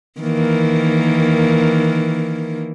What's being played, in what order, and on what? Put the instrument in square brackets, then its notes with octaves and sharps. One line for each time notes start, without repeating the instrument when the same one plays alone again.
[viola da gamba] D#3 E3 A#3